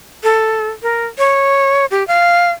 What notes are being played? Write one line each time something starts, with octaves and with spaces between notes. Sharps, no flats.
A4
A#4
C#5
G4
F5